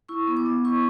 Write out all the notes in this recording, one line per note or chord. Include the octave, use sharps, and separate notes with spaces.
E4 C#6
B3
D6
B3
E4 C#6